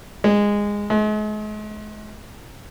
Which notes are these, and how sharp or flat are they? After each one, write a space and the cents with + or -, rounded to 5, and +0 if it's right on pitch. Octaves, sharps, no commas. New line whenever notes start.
G#3 -15
G#3 +40